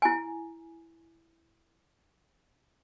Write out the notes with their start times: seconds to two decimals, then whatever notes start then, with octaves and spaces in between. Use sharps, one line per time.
0.02 E4 G#5